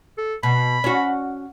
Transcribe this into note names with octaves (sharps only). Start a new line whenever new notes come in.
A4
B2 B5
C#4 F#4